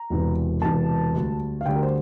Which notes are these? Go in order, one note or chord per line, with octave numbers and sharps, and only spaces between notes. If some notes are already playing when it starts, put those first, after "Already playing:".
Already playing: A#5
E1 E2 C3 E3
E1 E2 C3 E3 A5
D2 D3 G3
F5
D2 D3 G3 G5
A#4
C5